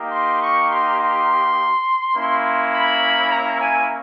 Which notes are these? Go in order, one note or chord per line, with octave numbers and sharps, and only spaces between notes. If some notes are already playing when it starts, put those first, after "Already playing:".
Already playing: A#3 D#4 G4
C6
C#6
C6
C6
A#3 C#4 E4
B5
A#5
G#5